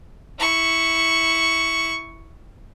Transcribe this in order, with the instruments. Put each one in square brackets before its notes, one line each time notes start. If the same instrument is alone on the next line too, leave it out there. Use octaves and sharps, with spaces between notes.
[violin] E4 C#6